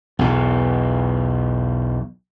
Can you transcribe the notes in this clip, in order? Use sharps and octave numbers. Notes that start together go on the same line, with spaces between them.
B1 E2 B2